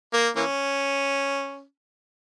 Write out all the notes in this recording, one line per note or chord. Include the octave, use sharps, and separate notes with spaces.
A#3
E3 A#3 C#4